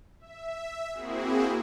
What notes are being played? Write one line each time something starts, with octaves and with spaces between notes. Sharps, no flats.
E5
A#3 C4 E4 F#4 G#4